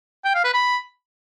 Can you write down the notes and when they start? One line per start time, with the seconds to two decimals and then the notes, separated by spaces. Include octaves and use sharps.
0.25 G5
0.35 F5
0.44 B4
0.54 B5